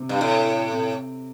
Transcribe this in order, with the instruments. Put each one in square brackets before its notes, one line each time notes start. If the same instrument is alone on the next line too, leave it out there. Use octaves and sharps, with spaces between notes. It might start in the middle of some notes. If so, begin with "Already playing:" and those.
Already playing: [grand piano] C3
[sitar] G2
A2
[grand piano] C3